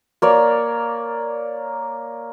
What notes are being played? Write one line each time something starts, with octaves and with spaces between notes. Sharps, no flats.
A#3 C#5 D5